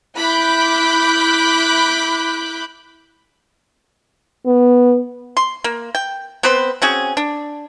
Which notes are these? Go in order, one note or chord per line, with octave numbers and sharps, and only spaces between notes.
E4 B5 D6 F#6 G6
B3
C6
A#3
G5
B3 C4 B4 C5
C4 C#4 F#4 G#4
D4